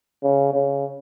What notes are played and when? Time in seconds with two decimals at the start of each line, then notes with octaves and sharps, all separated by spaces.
0.24 C#3
0.54 C#3